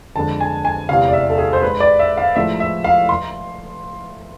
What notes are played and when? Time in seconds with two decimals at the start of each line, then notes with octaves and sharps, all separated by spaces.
0.16 F2 D3 G#3 A5
0.40 G#5
0.65 G#5
0.89 E2 C3 G#3 F5
1.09 D5
1.13 E5
1.30 A4
1.38 G#4
1.53 C5
1.62 G#2 G#3 B4
1.80 D5
1.99 E5
2.17 F5
2.36 A2 F3 G#3 E5
2.60 E5
2.84 F5
3.09 C6